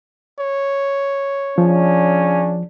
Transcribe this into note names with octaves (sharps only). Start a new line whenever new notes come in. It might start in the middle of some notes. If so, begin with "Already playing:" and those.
C#5
C#3 F3 C#4 D4